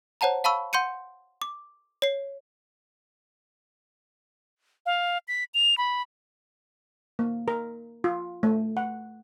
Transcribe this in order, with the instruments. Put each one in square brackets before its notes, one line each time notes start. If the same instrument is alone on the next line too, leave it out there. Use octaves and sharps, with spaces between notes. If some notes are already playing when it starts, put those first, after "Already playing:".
[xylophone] C5 C#5 F#5 A5 A#5
F5 A5 B5 C#6 E6
F#5 C6 G6 C#7 D#7
D6
C#5 C7
[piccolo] F5
B6
F7
B5
[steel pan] A#3
A#4
F4
A3
F#5